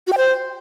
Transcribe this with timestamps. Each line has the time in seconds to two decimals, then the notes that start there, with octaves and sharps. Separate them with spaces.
0.07 F#4
0.12 G5
0.18 C5